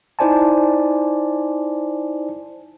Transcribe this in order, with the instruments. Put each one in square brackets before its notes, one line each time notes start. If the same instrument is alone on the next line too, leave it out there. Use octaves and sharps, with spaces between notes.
[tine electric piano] D#4 E4 C5 D5 G#5 A5